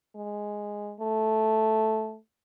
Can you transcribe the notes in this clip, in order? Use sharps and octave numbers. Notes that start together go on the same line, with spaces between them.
G#3
A3